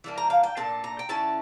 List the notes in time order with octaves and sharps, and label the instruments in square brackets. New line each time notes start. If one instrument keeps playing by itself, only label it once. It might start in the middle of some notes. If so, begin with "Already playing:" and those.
[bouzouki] E3 G3 A#3 D4
A#5
F5
G5
A#2 A3 D4 A5
A#5
G5
D3 A3 C#4 E4 A5